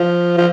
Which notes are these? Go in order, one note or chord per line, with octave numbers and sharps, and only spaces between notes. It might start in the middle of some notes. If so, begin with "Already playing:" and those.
Already playing: F3
F3